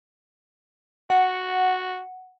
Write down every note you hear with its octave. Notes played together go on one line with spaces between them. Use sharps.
F#4 F#5